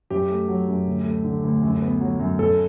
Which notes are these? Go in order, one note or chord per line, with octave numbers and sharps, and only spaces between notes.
F#2 G4
A3
F#3
F#2
D2
A3
D3
D2
F#2
B3
F#3
F#2
F#2 A4